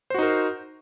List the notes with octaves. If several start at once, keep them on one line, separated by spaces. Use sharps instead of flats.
D#4 F#4 A#4 C5